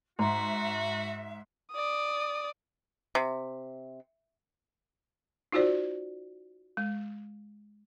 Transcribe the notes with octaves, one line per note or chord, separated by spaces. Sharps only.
G#2 F#4 E5 A#5 C6
D5 D#6
C3
D#4 F4 F#4 C5 D5
G#3